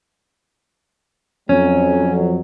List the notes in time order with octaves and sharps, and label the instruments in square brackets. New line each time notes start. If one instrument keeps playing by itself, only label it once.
[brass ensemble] F2 F#3 [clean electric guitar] C#4